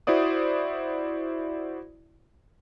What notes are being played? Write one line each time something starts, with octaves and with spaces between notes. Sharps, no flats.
E4 F#4 C5 D5 D#6